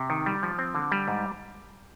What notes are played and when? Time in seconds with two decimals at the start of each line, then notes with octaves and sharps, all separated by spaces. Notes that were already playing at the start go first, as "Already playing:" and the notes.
Already playing: C3
0.10 D#3
0.26 G3
0.43 F3
0.59 C4
0.75 D3
0.92 G3
1.08 G#2